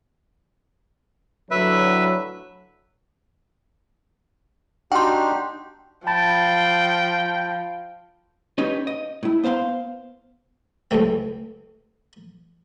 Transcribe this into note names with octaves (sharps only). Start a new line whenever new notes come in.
A2 D3 F#3 B4 E5
D4 D#4 F#4 G4 G5 C6
F3 G5 A5 B5 A6
C#4 D#4 G4 B4 D#5
D#5
A2 E4
B3 C5 F5 B5 C6
C#2 F#2 A2 C3 C4